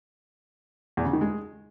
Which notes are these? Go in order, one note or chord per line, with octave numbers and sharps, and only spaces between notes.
E2
C#3
D#3
G#3